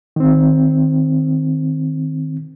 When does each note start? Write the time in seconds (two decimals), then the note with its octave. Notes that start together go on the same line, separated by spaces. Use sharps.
0.16 D#3 C4